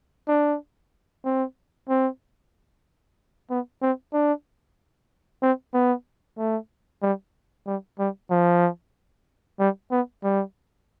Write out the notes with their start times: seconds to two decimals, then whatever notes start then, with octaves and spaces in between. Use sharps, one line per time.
0.28 D4
1.24 C4
1.89 C4
3.50 B3
3.82 C4
4.13 D4
5.42 C4
5.74 B3
6.38 A3
7.02 G3
7.66 G3
7.99 G3
8.30 F3
9.59 G3
9.91 B3
10.23 G3